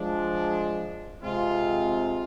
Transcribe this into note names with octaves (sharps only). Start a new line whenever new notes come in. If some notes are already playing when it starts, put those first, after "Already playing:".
Already playing: F3 G#3 D4
C3 G#3 C4 F4